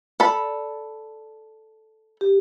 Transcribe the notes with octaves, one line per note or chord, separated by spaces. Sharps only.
A4 D5 B5
G4